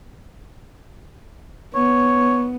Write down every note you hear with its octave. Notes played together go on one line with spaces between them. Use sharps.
B3 C#5